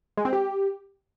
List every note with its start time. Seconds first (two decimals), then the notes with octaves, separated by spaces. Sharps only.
0.17 G#3
0.25 C4
0.33 G4